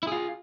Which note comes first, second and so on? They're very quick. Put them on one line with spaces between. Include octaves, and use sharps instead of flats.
E4 G#4 F4